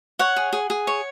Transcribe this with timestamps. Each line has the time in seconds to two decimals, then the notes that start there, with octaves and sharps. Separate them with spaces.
0.19 C#5 F#5
0.36 G#4
0.53 G#4
0.70 G#4
0.87 C#5